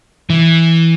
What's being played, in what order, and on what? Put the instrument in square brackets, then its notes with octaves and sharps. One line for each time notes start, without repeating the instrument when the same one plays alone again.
[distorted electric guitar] E3